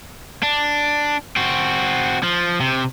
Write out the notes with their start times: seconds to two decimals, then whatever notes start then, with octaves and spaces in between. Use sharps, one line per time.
0.43 D4
1.36 C4 F#4
2.23 F3
2.60 C3